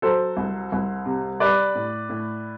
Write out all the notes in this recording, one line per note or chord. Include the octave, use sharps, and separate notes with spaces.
F#3 A4 C5
C2
C2
C3
G3 B4 D5
A2
A2